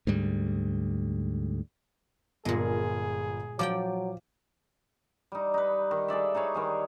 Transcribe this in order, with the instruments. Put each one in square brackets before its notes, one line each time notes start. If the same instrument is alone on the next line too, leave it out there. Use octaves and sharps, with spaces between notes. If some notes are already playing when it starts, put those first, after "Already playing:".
[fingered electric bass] D2 G#2 G3
[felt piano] G1 F4 [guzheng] A#2 G#3 [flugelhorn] G#4
[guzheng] F3 D5 G5 [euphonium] F#3 [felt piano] D6
[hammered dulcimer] G3 D#4
D#4 B4
D#3
G#4 A4 D5 E5
D#4 G#4 B4 C#5
D#3 G3 G#4